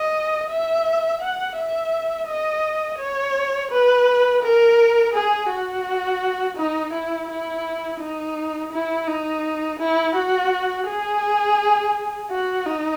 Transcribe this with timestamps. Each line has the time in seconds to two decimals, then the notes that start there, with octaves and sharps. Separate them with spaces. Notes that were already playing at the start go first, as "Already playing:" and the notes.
Already playing: D#5
0.49 E5
1.21 F#5
1.57 E5
2.28 D#5
2.99 C#5
3.71 B4
4.43 A#4
5.14 G#4
5.50 F#4
6.57 D#4
6.93 E4
7.29 E4
8.00 D#4
8.72 E4
9.08 D#4
9.79 E4
10.15 F#4
10.87 G#4
12.30 F#4
12.66 D#4